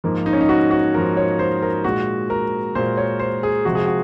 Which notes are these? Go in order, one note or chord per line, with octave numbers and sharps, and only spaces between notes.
G#2 F3 A#3
D#4
C#4
D#4
F#4
F#4
G#2 F3 A#3 A#4
C#5
C5
A#4
A#2 G#3 F#4
A#4
A#2 G#3 C5
C#5
C5
G#4
C3 F3 G#3 F#4
G#4
F#4